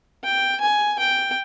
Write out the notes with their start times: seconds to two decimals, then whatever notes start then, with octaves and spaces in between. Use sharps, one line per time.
0.24 G5
0.61 G#5
0.99 G5